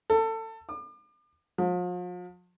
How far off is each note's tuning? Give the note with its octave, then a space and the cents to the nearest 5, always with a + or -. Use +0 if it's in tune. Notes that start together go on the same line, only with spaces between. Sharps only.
A4 +25
D6 +40
F3 +40